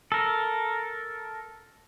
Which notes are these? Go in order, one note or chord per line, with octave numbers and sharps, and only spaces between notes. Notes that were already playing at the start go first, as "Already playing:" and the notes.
A4 A#4